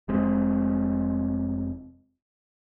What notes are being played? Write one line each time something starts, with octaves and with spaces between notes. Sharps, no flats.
F1 G#3 C4